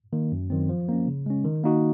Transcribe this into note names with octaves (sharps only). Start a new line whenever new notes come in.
D#3 A#3
F#2
D#3 F#3 C4
F3
A#3 C#4
C#3
G#3 C#4
D#3
A#3 D#4 F#4